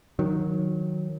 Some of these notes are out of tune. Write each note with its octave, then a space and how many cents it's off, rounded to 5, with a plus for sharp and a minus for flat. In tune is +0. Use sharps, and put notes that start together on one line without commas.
D#3 +0 F#3 -15